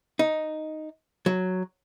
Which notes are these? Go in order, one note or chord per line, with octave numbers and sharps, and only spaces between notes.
D#4
F#3